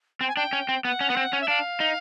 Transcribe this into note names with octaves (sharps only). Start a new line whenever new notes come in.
C4 G5
G#5
D4 G5
C#4
C4
B3 F#5
C#4
B3
C4
C#4
E5
D4 F5
D#4